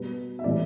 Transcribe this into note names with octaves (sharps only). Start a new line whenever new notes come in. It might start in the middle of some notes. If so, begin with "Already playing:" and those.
Already playing: B2 G3 B4
E5
A2 E3 G3 D5